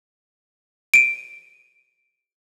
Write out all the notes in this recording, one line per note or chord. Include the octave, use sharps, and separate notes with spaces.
D7 D#7